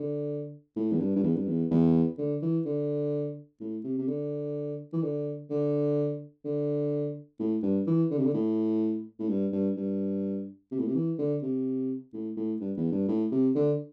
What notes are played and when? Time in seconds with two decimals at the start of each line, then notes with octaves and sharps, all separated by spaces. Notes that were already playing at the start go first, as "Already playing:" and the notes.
Already playing: D3
0.76 A2
0.92 E2
1.00 G2
1.16 G2
1.23 E2
1.36 G2
1.48 E2
1.71 E2
2.18 D3
2.42 E3
2.66 D3
3.61 A2
3.84 C3
3.98 C3
4.08 D3
4.93 E3
5.03 D3
5.50 D3
6.45 D3
7.39 A2
7.63 G2
7.87 E3
8.11 D3
8.18 C3
8.25 D3
8.34 A2
9.20 A2
9.29 G2
9.53 G2
9.77 G2
10.72 C3
10.79 A2
10.87 C3
10.95 E3
11.19 D3
11.43 C3
12.13 A2
12.37 A2
12.61 G2
12.77 E2
12.92 G2
13.08 A2
13.32 C3
13.56 D3